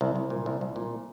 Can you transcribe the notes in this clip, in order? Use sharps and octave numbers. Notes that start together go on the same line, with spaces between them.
C2
C2
A#2
C2
C2
A#2